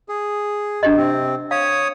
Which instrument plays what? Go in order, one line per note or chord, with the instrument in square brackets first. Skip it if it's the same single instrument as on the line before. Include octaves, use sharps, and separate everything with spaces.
[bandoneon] G#4
[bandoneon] F#2 [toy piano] D4 G4 D#5
[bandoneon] C3 C4
[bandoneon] C#5 D#6 [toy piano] F5